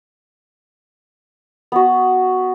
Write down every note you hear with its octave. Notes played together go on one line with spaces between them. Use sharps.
B3 F#4